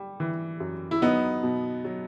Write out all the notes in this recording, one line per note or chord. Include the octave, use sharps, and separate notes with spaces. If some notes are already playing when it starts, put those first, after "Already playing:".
Already playing: G3
E3
F#2
E4
F#3 B3 D#4
B2
F#3